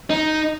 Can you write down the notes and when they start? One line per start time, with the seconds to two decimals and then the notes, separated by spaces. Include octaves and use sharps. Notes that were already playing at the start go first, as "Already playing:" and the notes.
0.10 D#4